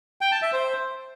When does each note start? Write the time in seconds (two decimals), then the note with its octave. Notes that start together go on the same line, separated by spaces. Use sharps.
0.21 G5
0.32 A5
0.42 E5
0.53 C5